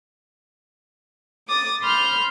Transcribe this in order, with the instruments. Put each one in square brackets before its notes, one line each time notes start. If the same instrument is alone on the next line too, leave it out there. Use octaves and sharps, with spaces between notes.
[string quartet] D6 D#6 A6
B5 C6 F6 G6